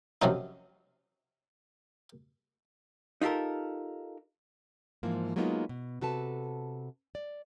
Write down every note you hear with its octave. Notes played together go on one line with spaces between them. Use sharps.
F#2 C3 F3 C#4 D#4
D#4 F4 G4 A4 A#4
G#2 E3 F3 A#3
F#3 G#3 A#3 B3 D#4 F4
B2
C3 F#4 A4 B4 A5
D5